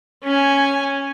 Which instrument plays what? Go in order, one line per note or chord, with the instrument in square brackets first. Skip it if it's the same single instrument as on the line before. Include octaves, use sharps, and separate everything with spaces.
[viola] C#4 G#5